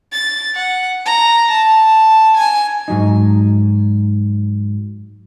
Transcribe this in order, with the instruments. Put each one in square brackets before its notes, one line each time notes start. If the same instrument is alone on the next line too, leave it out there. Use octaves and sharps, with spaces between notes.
[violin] A6
F#5
A#5
A5
G#5
[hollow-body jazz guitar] G#2 F#3 D#4